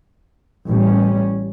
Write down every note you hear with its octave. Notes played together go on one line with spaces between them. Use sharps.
A1 G3 C#4